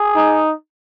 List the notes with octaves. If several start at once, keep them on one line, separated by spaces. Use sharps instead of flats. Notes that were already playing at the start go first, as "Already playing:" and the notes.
Already playing: G#4
D#4